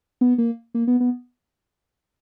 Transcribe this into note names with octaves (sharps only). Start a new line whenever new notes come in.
B3
A#3
A#3
B3
B3